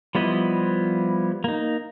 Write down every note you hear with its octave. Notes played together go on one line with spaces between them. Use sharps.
F3 G3 B3 E4 D#5
A#3 D#4